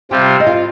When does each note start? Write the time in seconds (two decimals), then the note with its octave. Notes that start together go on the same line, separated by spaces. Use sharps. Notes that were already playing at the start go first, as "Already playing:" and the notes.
0.11 C3 G3 C4 F4 G4 G5
0.40 D#5
0.47 F4 F5